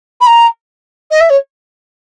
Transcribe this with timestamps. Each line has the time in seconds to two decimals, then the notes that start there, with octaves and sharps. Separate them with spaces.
0.21 B5
0.27 A#5
1.11 D#5
1.21 E5
1.30 C#5